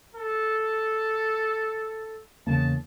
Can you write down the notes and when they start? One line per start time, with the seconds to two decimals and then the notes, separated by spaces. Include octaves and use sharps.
0.15 A4
2.47 E2 C#3 A#3 A5